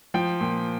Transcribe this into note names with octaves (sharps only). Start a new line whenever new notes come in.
F3 G5
A#2